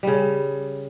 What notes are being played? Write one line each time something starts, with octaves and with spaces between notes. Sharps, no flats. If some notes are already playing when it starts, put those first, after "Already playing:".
C#3 G3